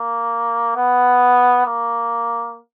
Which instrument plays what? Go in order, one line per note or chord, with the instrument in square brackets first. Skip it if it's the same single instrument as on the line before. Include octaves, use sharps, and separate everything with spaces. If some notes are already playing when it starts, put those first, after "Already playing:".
Already playing: [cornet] A#3
B3
A#3